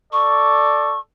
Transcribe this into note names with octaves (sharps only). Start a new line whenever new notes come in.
A4 D5 C#6